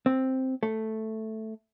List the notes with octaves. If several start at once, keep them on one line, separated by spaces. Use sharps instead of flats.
C4
A3